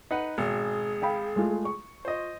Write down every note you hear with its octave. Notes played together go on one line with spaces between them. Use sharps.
D#4 B4 F#5
G#1 B2 G#4
F5 G5 B5
G#3 A3 F4
C#6
F4 C5 D#5